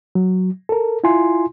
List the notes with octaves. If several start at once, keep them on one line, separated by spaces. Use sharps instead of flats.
F#3
A4 A#4
E4 F4 G#5 C6